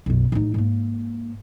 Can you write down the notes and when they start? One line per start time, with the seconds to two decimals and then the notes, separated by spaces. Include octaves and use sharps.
0.06 B1 F#2
0.32 A1 D#4
0.54 G#2 A#3